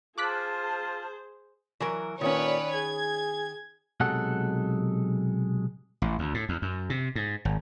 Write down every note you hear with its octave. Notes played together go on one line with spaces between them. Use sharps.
F4 G#4 C5 A5 D6 F6 F#6 B6
E3 F#3 A#4
A#2 D#3 C#4 B4 C#5 D5
G#4 G#6
B1 C3 F#3 G#3 A4 F#5
A1
D2
A2
E2
F#2
C3
G#2
G#1